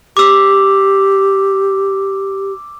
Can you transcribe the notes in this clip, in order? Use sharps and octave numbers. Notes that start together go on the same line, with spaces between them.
G4 D6 E6